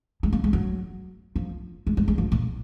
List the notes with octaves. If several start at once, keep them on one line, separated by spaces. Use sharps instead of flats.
G#3
A#3
G#3
F#3
F3
G#3
G#3
G#3
F3
A#2